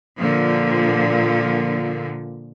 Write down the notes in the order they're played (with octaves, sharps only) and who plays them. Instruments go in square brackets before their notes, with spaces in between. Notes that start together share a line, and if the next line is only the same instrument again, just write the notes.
[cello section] A#2 D3 F3